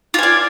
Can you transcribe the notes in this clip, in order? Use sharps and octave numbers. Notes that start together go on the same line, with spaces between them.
F4 D5 G#5